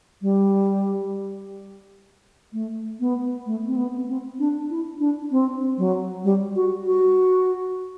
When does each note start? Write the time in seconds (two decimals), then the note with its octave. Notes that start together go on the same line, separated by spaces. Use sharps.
0.22 G3
2.53 A3
3.00 B3
3.46 A3
3.67 C4
3.76 B3
4.08 C4
4.39 D4
4.70 E4
5.00 D4
5.31 C4
5.78 F#3
6.24 G3
6.56 F#4
6.86 F#4